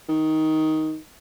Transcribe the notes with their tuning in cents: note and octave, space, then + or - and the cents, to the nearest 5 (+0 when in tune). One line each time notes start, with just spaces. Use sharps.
D#3 +10